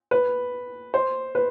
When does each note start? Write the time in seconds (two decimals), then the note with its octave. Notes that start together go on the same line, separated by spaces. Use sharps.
0.11 B4
0.94 C5
1.35 B4